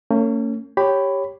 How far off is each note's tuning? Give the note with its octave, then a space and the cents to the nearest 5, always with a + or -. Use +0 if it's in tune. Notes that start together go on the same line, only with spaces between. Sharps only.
A#3 -45 C#4 +0
G4 +0 C#5 +0 B5 +10